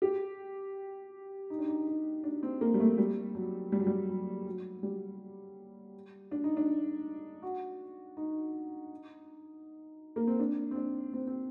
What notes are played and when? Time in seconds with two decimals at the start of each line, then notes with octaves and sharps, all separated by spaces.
0.02 G4
1.50 D#4
1.58 D4
1.68 D#4
1.87 D#4
2.24 D4
2.43 C4
2.61 A#3
2.74 G3
2.80 A3
2.98 G3
3.35 F#3
3.72 G3
3.79 F#3
3.87 G3
4.09 F#3
4.47 F#3
4.83 G3
6.31 D4
6.44 D#4
6.57 D4
7.43 F#4
8.17 D#4
10.16 A#3
10.27 C4
10.40 D4
10.71 C4
10.76 D4
11.13 C4
11.27 C4